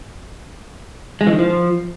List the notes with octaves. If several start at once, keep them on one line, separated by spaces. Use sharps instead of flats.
G#3
E3
D#3
F3